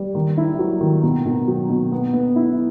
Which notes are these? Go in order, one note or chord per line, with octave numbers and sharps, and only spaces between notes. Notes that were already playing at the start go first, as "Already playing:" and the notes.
Already playing: G3
D#3
E4
F#3
D#3
B2
B2
F#3
B2
B3
B3
E4